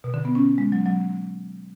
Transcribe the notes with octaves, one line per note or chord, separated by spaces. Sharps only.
B2
D3
B3
C#4
G#3
F#3
F#3